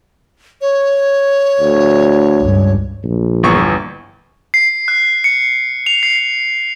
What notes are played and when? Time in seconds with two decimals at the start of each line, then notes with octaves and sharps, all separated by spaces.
0.61 C#5
1.60 D2
2.39 C#2 G2
3.04 A#1
3.43 G1 E2 C#6
4.54 C7
4.88 F#6
5.24 C#7
5.86 F7
6.03 C7